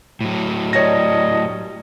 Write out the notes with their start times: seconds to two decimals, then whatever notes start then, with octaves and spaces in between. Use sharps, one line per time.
0.21 A2 F#3
0.73 G3 A#4 C#5 D#5 A5 A#6